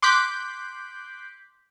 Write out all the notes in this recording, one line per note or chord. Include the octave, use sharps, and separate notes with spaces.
C6 D6 F#6 G6 B6